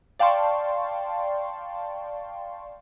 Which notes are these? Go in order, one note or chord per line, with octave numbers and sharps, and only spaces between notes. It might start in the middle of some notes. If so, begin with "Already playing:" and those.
D5 F5 G5 A5 C6 C#6